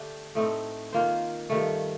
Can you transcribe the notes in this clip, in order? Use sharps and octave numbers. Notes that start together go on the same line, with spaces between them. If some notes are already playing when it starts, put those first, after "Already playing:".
Already playing: D3 A3 D4 G4
A2 A3 C4 D#4
D#3 A#3 F4 C5
G2 D#3 A3